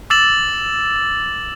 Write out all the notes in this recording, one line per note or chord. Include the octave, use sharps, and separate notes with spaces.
D6 E6 A6 E7 F#7